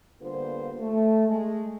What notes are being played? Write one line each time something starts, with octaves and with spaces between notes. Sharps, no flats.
D3 G3 A#3 B3 F4 C5
A3
G#3 A3